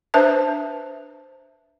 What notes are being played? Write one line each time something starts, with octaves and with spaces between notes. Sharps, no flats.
D4 B4 C5 E5 A5